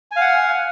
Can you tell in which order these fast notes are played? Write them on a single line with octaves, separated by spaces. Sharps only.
G#5 F5 F#5